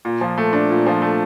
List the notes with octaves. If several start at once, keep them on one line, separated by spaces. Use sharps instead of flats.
A#2
F3
A3
D4
A#2
F3
A3